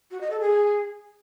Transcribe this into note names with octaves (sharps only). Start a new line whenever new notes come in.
F#4
D#5
A4
G#4